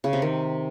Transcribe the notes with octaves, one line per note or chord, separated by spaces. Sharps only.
C#3
C3
D#3